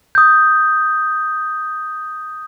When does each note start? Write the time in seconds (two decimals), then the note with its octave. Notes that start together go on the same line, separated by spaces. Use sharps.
0.15 D#6 G6